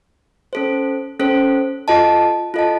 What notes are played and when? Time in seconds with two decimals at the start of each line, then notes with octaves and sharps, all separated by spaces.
0.53 C#4 A4 C5
1.20 C#4 A4 C5
1.88 F4 A4 D#5 A5
2.54 F4 A4 D#5 A5